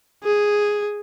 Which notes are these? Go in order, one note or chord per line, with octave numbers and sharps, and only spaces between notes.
G#4